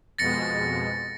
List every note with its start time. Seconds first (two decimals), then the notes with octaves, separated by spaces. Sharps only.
0.18 F2 B2 G#3 A6 A#6 C#7